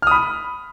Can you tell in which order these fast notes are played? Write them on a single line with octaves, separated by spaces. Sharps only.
F6 D#6 B5